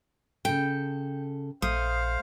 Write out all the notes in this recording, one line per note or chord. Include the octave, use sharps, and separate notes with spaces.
C#3 A4 G5
A#1 A3 C5 F5 D#6